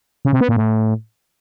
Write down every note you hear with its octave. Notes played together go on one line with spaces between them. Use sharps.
C#3
C3
B3
A#2
A2